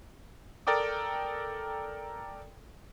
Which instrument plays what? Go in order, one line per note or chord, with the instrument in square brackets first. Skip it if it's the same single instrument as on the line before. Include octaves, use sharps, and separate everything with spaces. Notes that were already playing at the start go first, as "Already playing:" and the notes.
[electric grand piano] A4 A#4 D5 G5 D6 D#6